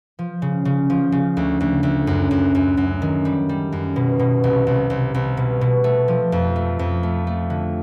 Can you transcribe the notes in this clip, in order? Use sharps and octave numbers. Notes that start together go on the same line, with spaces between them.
F3
C#3
C#3
F3
C#3
D2
D2
D2
F#2
F#2
F#2
F#2
D#3
G3
G3
F#2
B2
B2
C2
C2
C2
C2
B2
B2
A3
F3
F2
A3
F2
A3
A3
D3